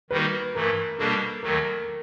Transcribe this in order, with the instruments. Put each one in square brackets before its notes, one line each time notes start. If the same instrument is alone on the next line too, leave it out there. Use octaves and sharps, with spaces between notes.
[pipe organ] D#3 G3 A#3 D#4 F#4 [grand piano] B4
[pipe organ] G2 E3 A3 [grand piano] A#4
[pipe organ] B2 G3 A#3 D4 F#4 [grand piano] A4
[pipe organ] D#2 D#3 F#3 A3 [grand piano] A#4